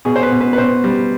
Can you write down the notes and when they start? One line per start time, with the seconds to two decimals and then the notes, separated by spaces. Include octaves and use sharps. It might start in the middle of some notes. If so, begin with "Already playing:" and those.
0.05 B2 G#4
0.16 C5
0.23 B4
0.31 B2
0.40 B4
0.53 B4
0.58 B2 C5
0.84 G3